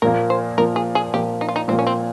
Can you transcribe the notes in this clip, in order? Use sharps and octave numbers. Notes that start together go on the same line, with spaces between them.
A#2 F3 A#3 A#4
C5
A#2 F3 A#3 A#4
G#4
G#4
A#2 F3 A#3 G4
D#4
F4
D#4
A#2 F3 A#3 C4
C#4
C4